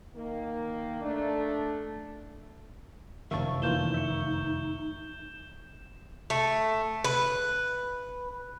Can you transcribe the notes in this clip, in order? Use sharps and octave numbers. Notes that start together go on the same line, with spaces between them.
D#3 A#3
A3 D4
F1 F#2 D#3 E5 F5 A5 C#6
E3 A#3 D#4 F4 G6 E7 G7
E5 C#6
A3
B4